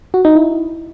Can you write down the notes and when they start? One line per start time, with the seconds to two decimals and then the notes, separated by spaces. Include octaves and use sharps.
0.14 F#4
0.25 D#4
0.35 E4